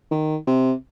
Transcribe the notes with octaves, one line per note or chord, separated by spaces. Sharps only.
D#3
C3